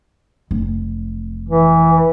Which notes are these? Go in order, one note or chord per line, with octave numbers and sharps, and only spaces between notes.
F1
E3